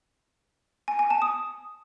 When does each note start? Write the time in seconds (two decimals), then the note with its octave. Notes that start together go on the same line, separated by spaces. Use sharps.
0.88 G#5
0.99 G#5
1.10 A5
1.22 D#6